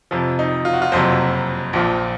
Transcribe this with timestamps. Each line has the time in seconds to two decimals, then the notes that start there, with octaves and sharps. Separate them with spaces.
0.11 F2 C3 F3
0.39 D#4
0.65 F4
0.73 F#4
0.82 F4
0.92 F#1 F2 C3 F#3 C5
1.73 A#1 A#2 F3